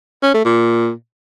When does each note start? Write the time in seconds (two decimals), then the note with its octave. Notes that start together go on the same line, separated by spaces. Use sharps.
0.23 C#4
0.34 A3
0.45 A#2